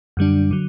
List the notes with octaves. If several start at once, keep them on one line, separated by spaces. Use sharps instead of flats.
F#2 D3 G3 D4
D3 F#3